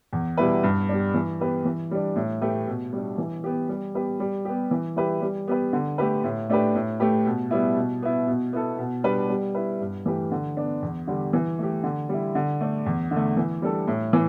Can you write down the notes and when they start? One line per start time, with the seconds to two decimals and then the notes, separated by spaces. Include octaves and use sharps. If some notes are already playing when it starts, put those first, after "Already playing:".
0.13 E2
0.37 B2 G3 E4 B4
0.63 G2
0.89 G3 D4
1.14 E3
1.40 B3 G4 B4
1.65 E3
1.91 G3 D4
2.16 A2
2.42 A3 G4 B4
2.67 B2
2.93 G3 D4
3.18 E3
3.44 B3 G4
3.69 G3
3.94 B3 G4 B4
4.20 G3
4.45 B3 G4
4.71 E3
4.96 G3 E4 G4 B4
5.22 G3
5.48 B3 G4 B4
5.73 D3
5.98 A3 G4 B4
6.24 A2
6.50 A3 D4 G4 B4
6.75 A2
7.00 A3 G4 B4
7.26 B2
7.51 G3 B3 E4
7.77 B2
8.03 B3 E4
8.27 B2
8.53 B3 E4 A4
8.78 B2
9.04 G3 D4 B4
9.29 G3
9.55 E4 B4
9.80 G2
10.06 E3 A3 G4 B4
10.31 D3
10.57 B3 D4
10.82 E2
11.07 D3 G3
11.33 E3
11.59 A3 G4
11.83 D3
12.09 G3 E4
12.35 D3
12.61 A3 D4
12.86 E2
13.11 D3
13.16 A3
13.37 E3
13.62 G3 D4 A4
13.88 A2
14.13 E3